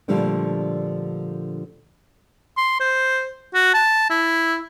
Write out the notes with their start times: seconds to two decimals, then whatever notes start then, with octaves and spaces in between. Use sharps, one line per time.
0.08 A#2 D3 F3 G3 A3 D4
2.57 C6
2.80 C5
3.54 F#4
3.74 A5
4.10 E4